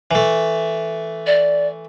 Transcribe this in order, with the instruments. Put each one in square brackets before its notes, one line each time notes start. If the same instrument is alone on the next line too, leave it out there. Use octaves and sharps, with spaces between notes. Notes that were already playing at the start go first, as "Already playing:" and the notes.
[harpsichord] E3 A3
[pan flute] D5